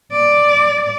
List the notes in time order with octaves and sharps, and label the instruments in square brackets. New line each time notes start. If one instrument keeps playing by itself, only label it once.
[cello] D5